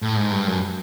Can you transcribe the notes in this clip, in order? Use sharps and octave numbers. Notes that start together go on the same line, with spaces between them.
A2
G#2
G2
F#2